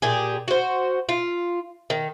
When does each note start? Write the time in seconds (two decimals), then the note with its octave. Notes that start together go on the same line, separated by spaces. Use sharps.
0.02 A#2 G4 G#4
0.48 F#4 C5
1.09 F4
1.90 D#3